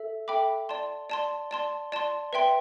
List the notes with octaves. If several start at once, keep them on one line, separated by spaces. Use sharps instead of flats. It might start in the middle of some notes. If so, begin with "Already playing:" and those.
Already playing: A4 E5
A4 E5 G5 B5 D6
D5 A5 C6
D5 A5 C6
D5 A5 C6
D5 A5 C6
B4 E5 G5 C6